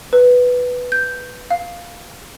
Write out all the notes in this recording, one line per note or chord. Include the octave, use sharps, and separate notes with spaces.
B4
G6
F5